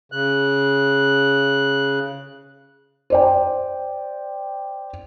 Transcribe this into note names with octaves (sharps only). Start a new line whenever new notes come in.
C#3 F#6
C5 D5 G5